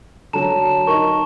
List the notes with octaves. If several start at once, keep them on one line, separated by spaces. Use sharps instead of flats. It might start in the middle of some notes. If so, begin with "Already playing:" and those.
D3 F#3 A5 A#5 E7
D#4 A#4 C#6